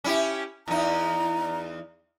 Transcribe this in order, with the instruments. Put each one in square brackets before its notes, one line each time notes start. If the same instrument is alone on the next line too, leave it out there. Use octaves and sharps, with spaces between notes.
[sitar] C#4 E4 G4
[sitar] E2 D#4 [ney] A#5